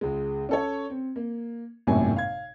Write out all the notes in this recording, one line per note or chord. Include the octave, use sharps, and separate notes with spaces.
C#2 G#3
C#4 A4 C#5
C4
A#3
G#1 F#2 A2 C3 A#3 G#5
F5 G#6